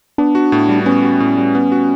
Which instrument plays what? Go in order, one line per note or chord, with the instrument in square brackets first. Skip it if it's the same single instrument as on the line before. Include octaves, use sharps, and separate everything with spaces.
[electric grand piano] B3 [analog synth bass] D4
[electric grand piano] F#4
A2
G3
[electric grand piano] B3 [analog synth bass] C#4
[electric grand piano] F#4
A2
G3
B3
F#4